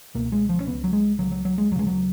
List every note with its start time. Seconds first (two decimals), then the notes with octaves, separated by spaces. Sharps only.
0.15 C#2 B2 A#3
0.32 G#3
0.49 F3
0.60 C#4
0.67 C#2 C#3 B3
0.84 F#3
0.93 G#3
1.19 C#2 C#3 F#3
1.32 F#3
1.45 F#3
1.58 G#3
1.71 D#2 F#3
1.76 C#3 G#3
1.87 F#3